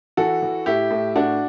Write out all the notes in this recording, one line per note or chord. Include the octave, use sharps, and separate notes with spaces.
E3 F#4 A4
E3
A2 E4 G4
A2
A2 D4 F#4